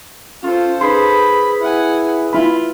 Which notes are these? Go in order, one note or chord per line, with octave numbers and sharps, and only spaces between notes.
C#4 F4 A4 C5
D#4 G#4 B4 B5 C6 D#6
E4 F#5 G#5
E4 F4 B5